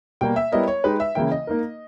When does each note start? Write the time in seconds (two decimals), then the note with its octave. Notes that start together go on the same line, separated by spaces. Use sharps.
0.21 B2 G3 A#3 G5
0.36 E5
0.52 G3 B3 E4 A#4 C#5 D#5
0.68 C#5
0.84 G#3 D#4 G4 B4
1.00 E5
1.15 C#3 E3 A#3 E4 G5
1.31 D#5
1.47 A#3 D#4 A#4